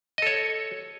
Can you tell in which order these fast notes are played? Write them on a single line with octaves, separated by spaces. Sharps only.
D#5 A4 C#5